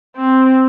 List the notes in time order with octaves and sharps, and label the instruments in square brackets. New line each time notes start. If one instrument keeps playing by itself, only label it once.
[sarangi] C4